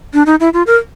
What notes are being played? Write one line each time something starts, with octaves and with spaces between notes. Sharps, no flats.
D4
D#4
E4
F4
A#4